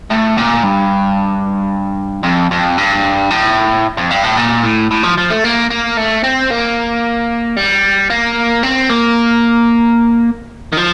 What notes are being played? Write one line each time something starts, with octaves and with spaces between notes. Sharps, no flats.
A2
A#2
G2
F2
F2
G2
A2
F2
G2
A2
A#2
A2
A2
F3
F3
A3
A#3
A#3
A3
C4
A#3
G3
A#3
C4
A#3
D#3
F3